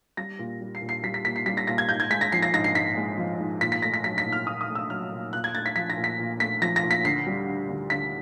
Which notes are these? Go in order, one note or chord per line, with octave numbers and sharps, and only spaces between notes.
G3 A#6
A#2
G3
C7
A#2
C7
G3 B6
B6
A#2 B6
C7
G3 B6
A#6
A#2 A#6
G#6
G#2 G6
G#6
G#3 B6
A#6
F3 C7
A#6
G#2 A#6
C7
G#2 B6
G#3
F3
G#2
A#2 B6
B6
A3 A#6
B6
F#3 B6
B6
A#2
F6
A#2 D#6
D#6
A3
E6
F#3 F6
A#2
A#2 F#6
G#6
A3 A6
B6
F3 B6
A#6
A#2
B6
A#2
A3 B6
F3 A#6
A#6
A#2
B6
D2 C7
G3
D3
D2
D2 B6